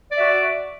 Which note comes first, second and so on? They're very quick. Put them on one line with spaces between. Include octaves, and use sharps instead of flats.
D5 E5 F#4